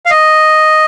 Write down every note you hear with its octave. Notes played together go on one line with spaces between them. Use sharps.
F5
D#5